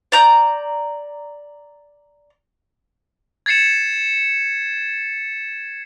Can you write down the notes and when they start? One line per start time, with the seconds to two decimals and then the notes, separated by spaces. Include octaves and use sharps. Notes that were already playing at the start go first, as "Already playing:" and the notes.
0.12 D5 A#5 G6
3.46 G#6 A6 C7 C#7 E7